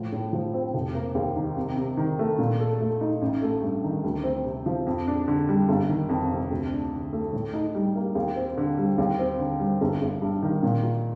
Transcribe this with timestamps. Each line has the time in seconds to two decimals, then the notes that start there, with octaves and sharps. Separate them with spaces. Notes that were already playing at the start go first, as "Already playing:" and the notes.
Already playing: A2 F3
0.13 A2
0.33 F3
0.54 C4
0.74 F1
0.95 A#3
1.15 D#2
1.36 D#3
1.57 C3
1.77 C3
1.97 D#3
2.19 A3
2.39 A#2
2.60 A4
2.80 A3
3.01 D#4
3.22 A1
3.42 A3
3.62 G2
3.84 D#3
4.04 D2
4.24 C4
4.45 C3
4.66 F3
4.87 F2
5.07 D4
5.28 D3
5.49 G3
5.69 G1
5.89 D#3
6.09 F2
6.31 C3
6.50 D2
6.72 D4
6.93 D3
7.13 A3
7.33 A2
7.53 D#4
7.75 G3
7.95 A#3
8.15 D#2
8.36 C4
8.57 D3
8.78 G3
8.98 D#2
9.19 C4
9.39 D3
9.60 G3
9.81 G1
10.02 G1
10.22 G2
10.43 D#3
10.63 A#2
10.83 F4